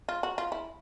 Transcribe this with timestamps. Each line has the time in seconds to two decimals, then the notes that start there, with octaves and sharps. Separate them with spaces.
0.09 F4
0.23 F#4
0.38 F4
0.52 E4